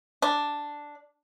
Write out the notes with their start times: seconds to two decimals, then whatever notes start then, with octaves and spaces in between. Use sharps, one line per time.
0.22 D4